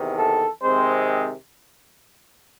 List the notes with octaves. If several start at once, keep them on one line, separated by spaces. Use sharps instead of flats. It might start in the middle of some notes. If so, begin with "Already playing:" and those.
Already playing: E2 C3 D#3
A4
C3 D#3 G#3 C4 C5